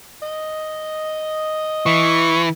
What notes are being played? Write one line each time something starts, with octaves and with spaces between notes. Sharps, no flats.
D#5
E3 C#6